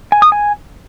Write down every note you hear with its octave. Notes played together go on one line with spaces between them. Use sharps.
G#5
D#6
G#5